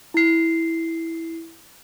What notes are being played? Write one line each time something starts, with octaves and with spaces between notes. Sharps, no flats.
E4 C7